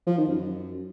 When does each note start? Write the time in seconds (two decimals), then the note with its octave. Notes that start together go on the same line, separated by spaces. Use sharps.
0.07 F3
0.17 D#3
0.28 F#2